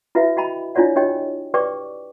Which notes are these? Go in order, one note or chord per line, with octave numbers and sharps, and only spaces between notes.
E4 F#4 B4 E5 F5
F#4 D#5 G5 A#5 B5
D4 E4 F4 C#5 D5 F#5
D4 F#4 G4 C#5 D#5 G5
G4 B4 D5 G5 C#6 D6